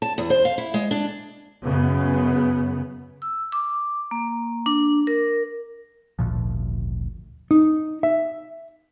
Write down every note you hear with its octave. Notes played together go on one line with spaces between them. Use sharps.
A5
E2
C5
F5
E4
G#3
D4
F#2 C#3 B3
E6
D6
A#3
D4
A#4
G#1 D2 A#2 F3
D#4
E5